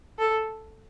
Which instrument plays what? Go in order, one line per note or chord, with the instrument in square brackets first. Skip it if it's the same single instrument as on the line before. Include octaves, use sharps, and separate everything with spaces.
[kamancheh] A4